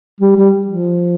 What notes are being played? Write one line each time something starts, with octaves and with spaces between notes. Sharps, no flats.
G3
G3
F3